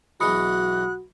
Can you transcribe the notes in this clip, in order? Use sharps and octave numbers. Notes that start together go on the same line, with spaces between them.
B1 E3 G#3 F#4 B5 D#6 F#6 C#7